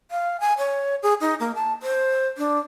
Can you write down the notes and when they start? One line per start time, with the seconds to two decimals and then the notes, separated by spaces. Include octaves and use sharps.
0.11 F5
0.40 G#5
0.58 C#5
1.03 G#4
1.21 D#4
1.40 A#3
1.55 A5
1.83 C5
2.38 D4